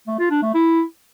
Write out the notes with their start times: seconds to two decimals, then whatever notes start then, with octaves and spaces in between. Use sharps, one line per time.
0.07 A3
0.19 F4
0.31 D4
0.42 A3
0.54 E4